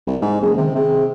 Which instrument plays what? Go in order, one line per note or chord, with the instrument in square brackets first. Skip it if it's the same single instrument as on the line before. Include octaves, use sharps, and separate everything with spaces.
[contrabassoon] C2
G#2
[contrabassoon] F#1 [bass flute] G#4
[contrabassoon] C3 [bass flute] D#3
[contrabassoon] C3 [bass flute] G#4